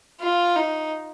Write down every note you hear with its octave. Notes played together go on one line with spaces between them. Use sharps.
F4
D#4